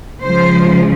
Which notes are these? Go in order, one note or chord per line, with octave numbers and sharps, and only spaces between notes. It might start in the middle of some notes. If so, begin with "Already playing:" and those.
C#3 F3 G#3 C5